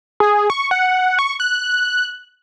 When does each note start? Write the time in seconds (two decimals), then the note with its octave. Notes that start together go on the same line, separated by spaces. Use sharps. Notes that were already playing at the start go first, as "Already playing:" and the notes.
0.20 G#4
0.50 C#6
0.71 F#5
1.19 C#6
1.40 F#6